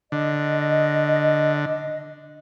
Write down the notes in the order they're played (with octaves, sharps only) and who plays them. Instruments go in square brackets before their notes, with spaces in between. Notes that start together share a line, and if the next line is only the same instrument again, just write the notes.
[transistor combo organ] D3 [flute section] D#5